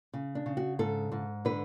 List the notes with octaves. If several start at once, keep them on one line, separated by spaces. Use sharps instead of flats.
C#3
D4
C#3
F#4
G#2 A4
G#2
D3 B4